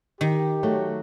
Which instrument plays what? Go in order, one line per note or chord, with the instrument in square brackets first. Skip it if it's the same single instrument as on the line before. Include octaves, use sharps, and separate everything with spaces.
[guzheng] D#3 [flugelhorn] G4
[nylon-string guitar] F#3 A3